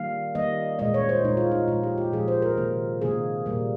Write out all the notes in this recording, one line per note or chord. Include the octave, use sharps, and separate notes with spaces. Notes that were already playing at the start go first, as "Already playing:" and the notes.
Already playing: D#3 G3 A#3 F5
D#3 G3 A#3 D#5
A#2 G#3 D#5
C#5
C5
A#2 G#3 D#4
F4
D#4
A#2 F3 G#3 F4
G4
G4
A#2 F3 G#3 G#4
C5
A#4
C3 D#3 A#3
C3 D#3 A#3 G#4
A#2 G3 A#3